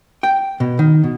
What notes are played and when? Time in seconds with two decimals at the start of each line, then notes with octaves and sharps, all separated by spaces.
0.23 G5
0.60 B2
0.79 D#3
1.04 B2